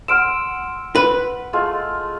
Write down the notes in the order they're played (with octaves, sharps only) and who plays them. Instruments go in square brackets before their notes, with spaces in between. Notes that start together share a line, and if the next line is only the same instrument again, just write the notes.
[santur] F#5 C6 E6 [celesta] F6 D7 E7
[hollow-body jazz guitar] B4
[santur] G#3 A3 F4